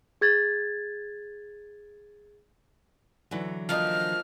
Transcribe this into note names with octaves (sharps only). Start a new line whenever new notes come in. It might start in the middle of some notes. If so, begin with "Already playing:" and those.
G#4 G#6 A6
D3 E3 F#3
F3 A#3 D#4 F6